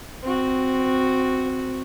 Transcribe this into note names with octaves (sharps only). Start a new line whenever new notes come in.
C4 F#4